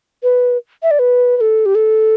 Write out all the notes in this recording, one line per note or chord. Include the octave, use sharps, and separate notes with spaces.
B4
E5
D5
B4
B4
A4
G4
A4